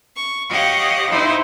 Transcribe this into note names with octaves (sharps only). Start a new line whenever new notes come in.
C#6
G4 C#5 D#5 F5 F#5
D#4 E4 C5